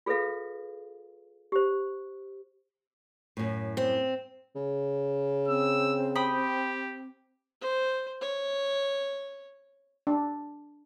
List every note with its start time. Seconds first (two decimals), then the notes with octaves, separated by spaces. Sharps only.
0.06 F4 G#4 A4 B4 E5 F5
1.52 G4 C5
3.37 F#2 A2
3.77 C4
4.55 C#3
5.48 C4 E6
6.15 G4 G5 B5 D#6
7.61 C5
8.21 C#5
10.07 D4